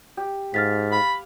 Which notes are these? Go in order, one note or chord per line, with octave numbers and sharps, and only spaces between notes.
G4
G#2 F5 F6 A6 B6
F5 B5